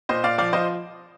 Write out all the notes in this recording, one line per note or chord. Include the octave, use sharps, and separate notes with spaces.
A#2 C5 D#5
A#2 D5 F5
F3 D5 F5
F3 C5 D#5